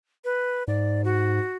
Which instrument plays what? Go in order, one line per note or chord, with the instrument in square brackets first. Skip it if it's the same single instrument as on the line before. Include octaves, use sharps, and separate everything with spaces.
[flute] B4
[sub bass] G#2 [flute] D5
[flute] F#4